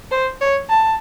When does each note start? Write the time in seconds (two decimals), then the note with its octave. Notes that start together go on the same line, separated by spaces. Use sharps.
0.11 C5
0.41 C#5
0.70 A5